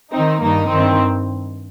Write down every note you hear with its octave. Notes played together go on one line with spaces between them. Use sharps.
D#3 C4 D#4
G2 D#3 A#3 D#4
G2 D#3 C4